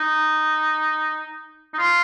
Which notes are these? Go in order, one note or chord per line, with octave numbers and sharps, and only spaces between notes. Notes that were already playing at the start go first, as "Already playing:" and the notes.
Already playing: D#4
D#4
F4